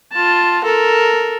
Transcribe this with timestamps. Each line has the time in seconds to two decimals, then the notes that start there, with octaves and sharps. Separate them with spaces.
0.12 F4 A5
0.64 A4 A#4